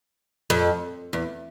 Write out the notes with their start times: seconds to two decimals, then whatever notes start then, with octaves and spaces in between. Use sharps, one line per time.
0.50 F2
1.13 E2